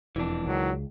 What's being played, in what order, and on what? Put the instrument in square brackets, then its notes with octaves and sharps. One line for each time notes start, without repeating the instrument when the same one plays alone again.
[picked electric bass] E1 F2 [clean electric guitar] E3 D4
[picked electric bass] C#2 [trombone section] D#3 F#3